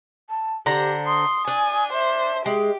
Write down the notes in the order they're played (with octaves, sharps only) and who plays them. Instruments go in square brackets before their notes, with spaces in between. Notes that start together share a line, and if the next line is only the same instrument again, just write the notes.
[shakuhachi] A5
[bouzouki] D3 C5 A#5 [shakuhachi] G4
[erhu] C6 [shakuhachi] D#6
[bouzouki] D4 [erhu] G#5
[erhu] C5 [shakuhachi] E5
[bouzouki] G#3 [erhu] G4 [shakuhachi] E5